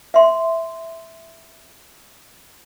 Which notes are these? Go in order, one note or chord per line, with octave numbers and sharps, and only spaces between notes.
E5 C6